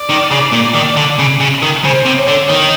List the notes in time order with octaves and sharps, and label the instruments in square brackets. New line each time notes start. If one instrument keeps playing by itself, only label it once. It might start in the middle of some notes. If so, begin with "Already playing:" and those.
Already playing: [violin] D5
[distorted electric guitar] D#3
C#3
[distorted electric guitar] A#2 [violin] D5
[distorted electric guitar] D#3
D3
C#3
C#3
D#3
[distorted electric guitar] C#3 [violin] C5
[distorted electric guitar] C3
[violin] C#5
[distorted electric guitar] D3
D#3